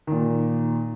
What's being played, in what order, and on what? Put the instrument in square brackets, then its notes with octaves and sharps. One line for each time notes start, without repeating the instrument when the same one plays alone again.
[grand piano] A#2 D#3